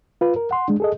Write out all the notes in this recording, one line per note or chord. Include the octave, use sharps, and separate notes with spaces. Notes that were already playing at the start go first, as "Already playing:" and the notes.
F4 B4
A#4
F#5 C6
G#3 D4
G#4 A4 D#5